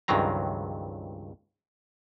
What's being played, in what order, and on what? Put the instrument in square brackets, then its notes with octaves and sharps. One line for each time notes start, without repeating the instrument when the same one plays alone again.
[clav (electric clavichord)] C#2 G2 D#3 F#3 C4 A#5